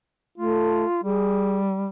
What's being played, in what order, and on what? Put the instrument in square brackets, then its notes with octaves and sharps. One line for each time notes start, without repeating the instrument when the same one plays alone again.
[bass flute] A3 [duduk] F4
[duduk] G3 [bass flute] G#4